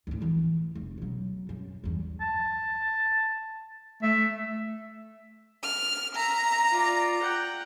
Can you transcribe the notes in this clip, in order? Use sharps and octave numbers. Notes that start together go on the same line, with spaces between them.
D2 A2
E3 F3
F1
B2 F#3
F#2
E2 G2
A5
A3 E5
F6
E5 A#5
F4 D5
F#5 G5